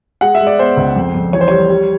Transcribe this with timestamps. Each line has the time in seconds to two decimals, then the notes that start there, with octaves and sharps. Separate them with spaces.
0.21 G#3 F#5
0.35 E5
0.41 G#3
0.47 D5
0.59 B3 C5
0.77 C#2
0.96 F2
1.15 F2
1.33 E3 C#5
1.41 C5
1.48 G3 C#5
1.69 G3